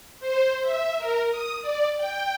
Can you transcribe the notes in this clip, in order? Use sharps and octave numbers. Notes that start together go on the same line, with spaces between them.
C5
E5
A#4
D#6
D5
G5